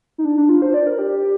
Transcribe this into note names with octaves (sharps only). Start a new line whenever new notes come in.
D#4
D4
D4
F4
C5
D5
A#4
G4